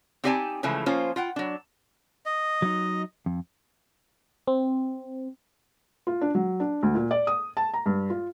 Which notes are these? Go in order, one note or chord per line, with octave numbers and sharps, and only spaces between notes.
C4 D#4 G4 D5 G#5 A5
C#3 E3 F3 G#3 A3
F3 A#3 C#4 F4 C5
F4 F#5 G5
F#3 D4
D#5
F#3 D#4
F2
C4
F4
D4
F#3
D4
D2
A#2
D5
D#6
A5
A#5
G2
F4